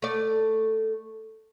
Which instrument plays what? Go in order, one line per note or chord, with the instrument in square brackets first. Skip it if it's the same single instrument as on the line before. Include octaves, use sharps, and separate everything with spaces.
[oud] A3 D5